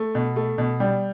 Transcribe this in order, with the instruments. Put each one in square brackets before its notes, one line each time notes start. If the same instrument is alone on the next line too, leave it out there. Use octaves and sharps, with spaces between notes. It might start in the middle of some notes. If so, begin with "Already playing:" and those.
Already playing: [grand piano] A3
B2
A3
B2
G3